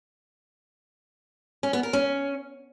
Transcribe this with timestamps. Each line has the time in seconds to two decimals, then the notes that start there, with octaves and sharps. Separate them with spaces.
1.63 C#4
1.73 B3
1.83 A#4
1.93 C#4